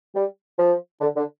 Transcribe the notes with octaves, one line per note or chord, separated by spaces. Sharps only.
G3
F3
D3
D3